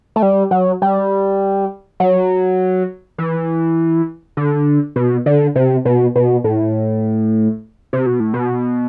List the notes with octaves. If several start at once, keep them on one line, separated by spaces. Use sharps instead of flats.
A3
G3
F#3
G3
F#3
E3
D3
B2
D3
C3
B2
B2
A2
C3
B2
A2
B2